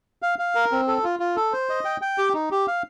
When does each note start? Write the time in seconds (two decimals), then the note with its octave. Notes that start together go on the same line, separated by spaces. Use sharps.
0.22 F5
0.39 F5
0.55 A#4
0.72 C4
0.88 A4
1.04 F4
1.20 F4
1.36 A4
1.53 C5
1.70 D#5
1.85 G5
2.02 G5
2.18 G4
2.34 D#4
2.51 G4
2.67 F5